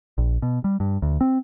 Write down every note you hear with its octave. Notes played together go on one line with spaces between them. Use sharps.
A#1
B2
G3
G2
D2
C4